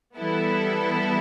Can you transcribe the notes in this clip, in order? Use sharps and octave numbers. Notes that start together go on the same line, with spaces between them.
E3 G3 B3 E4 A4